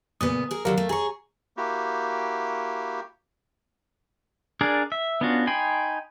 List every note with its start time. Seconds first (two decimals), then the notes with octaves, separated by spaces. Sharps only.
0.21 A#2 C#3 B3 D#6
0.51 G#4 A#4
0.65 D3 F#3 G3 A#4 F5
0.77 A3
0.89 G#4 C#5 G#5 A#5 C#6
1.57 A#3 E4 F#4 G4
4.61 D4 G#4 A#4 D5
4.92 E5
5.21 B3 C#4 D4 F4 F#4
5.47 D#4 G5 G#5 B5 C6